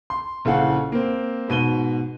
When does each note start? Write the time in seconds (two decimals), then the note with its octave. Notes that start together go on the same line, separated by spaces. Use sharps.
0.10 C6
0.45 A#1 C#3 E3 A4 F5 F#5
0.92 A#3 C4
1.48 G#2 B2 D#7 G7